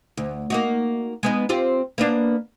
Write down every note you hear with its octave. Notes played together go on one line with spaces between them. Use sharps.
D2
A#3 D#4 F#4
G#3 B3 D#4
C4 F4 G4
A#3 B3 D4